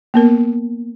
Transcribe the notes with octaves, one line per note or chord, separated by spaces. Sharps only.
A#3 B3 A#4